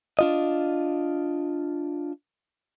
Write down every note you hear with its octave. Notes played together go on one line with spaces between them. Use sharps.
D4 F4 D#5